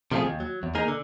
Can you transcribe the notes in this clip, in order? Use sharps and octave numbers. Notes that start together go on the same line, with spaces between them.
C3 F3 A3 D4 F4 G#4
D#2
F#3
E2
A#3 D#4 G#4 A#4
D3